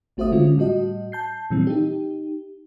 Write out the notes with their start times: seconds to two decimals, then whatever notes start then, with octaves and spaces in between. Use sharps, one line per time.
0.17 G#1 A3 F#4 C5 E5 D#6
0.32 D3 G#3 C#4 F4
0.58 A2 G3 F#4 D#5
1.12 A5 G6 C7
1.50 A#2 E3 G3 C4
1.67 D#4 G4